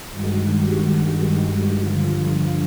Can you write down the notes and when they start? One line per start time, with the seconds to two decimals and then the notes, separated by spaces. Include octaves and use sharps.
0.11 G2 D#3 G#3 F#4
0.52 G4
0.94 G4
1.77 G2 D3 F3 F4
2.19 F4